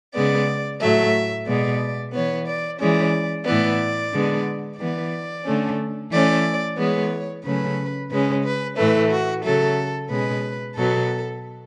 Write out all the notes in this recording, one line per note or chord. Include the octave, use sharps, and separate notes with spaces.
C#3 G#3 B3 D5
A2 F#3 A3 E5
B2 G#3 B3 D5
E3 B3 C#5
D5
E3 G#3 C#4 D5
A2 E3 B3 D5
D3 G#3 B3
E3 B3 D5
D3 A3 C#4
E3 A3 C#4 D5
E3 G#3 B3 C#5
C#3 F#3 A3 C#4 B4
C#3 G#3 C#4 B4
B4
A2 E3 A3 B4
F#4
C#3 F#3 A3 A4
B2 G#3 C#4 B4
B2 F#3 B3 A4